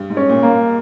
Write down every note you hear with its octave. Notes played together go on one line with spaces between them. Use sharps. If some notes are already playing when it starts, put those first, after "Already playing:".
Already playing: G2
G#2
C#4
A#2
A#3
A#2